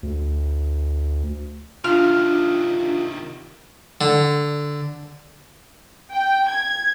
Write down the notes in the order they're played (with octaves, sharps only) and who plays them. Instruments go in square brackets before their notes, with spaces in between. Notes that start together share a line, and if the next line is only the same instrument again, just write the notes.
[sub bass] D2
[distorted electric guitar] C3 D#3 [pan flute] D4 [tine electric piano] F4 [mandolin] F6
[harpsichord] D3
[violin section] G5
G#6